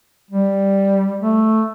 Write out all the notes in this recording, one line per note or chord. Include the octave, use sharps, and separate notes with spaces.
G3
A3